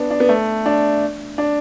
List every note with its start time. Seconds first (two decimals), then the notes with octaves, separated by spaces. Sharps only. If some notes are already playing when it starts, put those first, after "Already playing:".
Already playing: B3 D4
0.11 D4
0.20 B3
0.29 A3
0.66 D4
1.38 D4